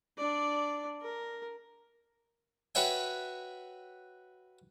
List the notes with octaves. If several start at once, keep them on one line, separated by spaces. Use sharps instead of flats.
D4 D5
A#4
F#4 B4 C#5 E5 G5 G#5